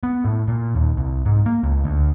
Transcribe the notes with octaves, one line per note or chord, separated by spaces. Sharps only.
B3
A2
A#2
D#2
C2
G#2
A#3
C#2
D2